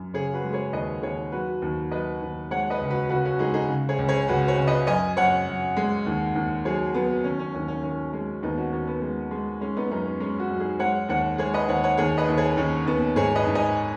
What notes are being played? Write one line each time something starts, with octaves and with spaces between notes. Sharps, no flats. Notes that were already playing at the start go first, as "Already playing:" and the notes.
Already playing: F#2
C#3 G#4 C#5
F#4 B4
G#3
G#4 C#5
D#2 B4 D#5
D#2 G#4 C#5
F#3 F#4 B4
D#2
F#3 B4 D#5
D#2
G#3 C#5 F#5
B4 D#5
C#2
F#4 B4
C#3 F#4 B4
C#4 F#4
G#3 D#4 G#4
D#4 G#4
C#3
G#4 C#5
C#2
G#4 C#5
C#2 F#4 B4
G#4 C#5
C#3
B4 D#5
F#2 D#5 G#5
F#2 C#5 F#5
F#2
G#3
D#2
D#2
F#3 G#4 C#5
F#3 B3
D#3 C#4
C#4
D#2 C#4
C#4
D#3 C#4
G#3 C#4
D#2 B3 D#4
C#4 F#4
D#2 C#4
B3
G#3
G#3
G#3 C#4
B3 D#4
F#2 B3 D#4
C#4
G#3 C#4
C#4 F#4
F#2
D#4 G#4
G#3 C#5 F#5
D#2 C#5 F#5
G#3 G#4 C#5
B4 D#5
D#2 C#5 F#5
C#5 F#5
D#2 G#4 C#5
B4 D#5
D#2
G#4 C#5
D#2 C#4
D#2 B3
G#2 G#4 C#5
B4 D#5
G#2
D#5 G#5